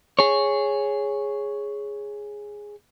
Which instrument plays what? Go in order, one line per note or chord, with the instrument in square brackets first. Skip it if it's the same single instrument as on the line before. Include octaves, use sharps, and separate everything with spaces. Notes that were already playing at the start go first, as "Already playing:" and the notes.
[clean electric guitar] G#4 C#5